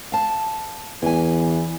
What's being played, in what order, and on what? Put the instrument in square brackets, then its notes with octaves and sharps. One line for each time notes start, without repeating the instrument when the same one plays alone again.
[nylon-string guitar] F5 A5
[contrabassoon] E2 [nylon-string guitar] E3 G#5